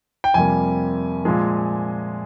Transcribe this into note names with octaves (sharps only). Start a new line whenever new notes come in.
G5
F2 C3 G3 A#3 G#5
A#2 F3 G#3